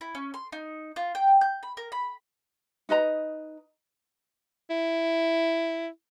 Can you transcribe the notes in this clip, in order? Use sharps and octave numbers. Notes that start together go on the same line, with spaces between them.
E4
C#4
C6
D#4
F4
G5
G6
B5
A#4
B5
D#4 B4 D#5 A#5
E4